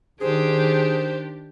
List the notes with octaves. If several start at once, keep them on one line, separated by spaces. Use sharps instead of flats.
D#3 D4 G4 G#4 C5